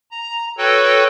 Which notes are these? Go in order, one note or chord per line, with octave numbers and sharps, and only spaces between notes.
A#5
F#4 A4 B4 C#5 G5